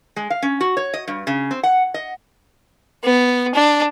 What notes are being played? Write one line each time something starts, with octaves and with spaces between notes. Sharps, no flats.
G#3
F5
C#4
F#4
C#5
D#5
G2
C#3
C4
F#5
D#5
B3
D4